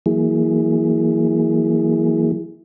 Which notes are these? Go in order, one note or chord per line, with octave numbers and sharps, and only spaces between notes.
E3 F#3 A#3 E4 G#4